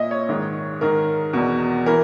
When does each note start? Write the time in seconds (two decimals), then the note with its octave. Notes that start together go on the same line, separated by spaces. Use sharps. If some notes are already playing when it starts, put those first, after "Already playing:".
Already playing: A#2 D#5 E5
0.11 C#5
0.29 G#2 D#3
0.81 G#2 D#3 A#4
1.33 E2 B2
1.86 E3 A#4